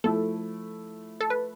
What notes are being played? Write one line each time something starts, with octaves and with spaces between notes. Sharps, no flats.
F3 A3 E4 A4
A4
B4